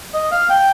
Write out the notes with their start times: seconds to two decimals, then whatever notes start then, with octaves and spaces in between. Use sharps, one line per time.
0.14 D#5
0.32 F5
0.50 G5